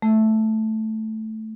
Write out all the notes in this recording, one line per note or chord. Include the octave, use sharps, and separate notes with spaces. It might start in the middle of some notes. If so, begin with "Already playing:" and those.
A3